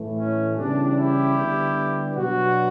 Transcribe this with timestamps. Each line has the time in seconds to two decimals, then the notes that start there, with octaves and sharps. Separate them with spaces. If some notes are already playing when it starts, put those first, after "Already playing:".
Already playing: A2 E3 A3
0.17 C#4
0.56 C#3 E3 G3 B3 D4
0.96 E4 G4
1.35 D3 G3 B3
2.14 B2 F#3 B3 D4 F#4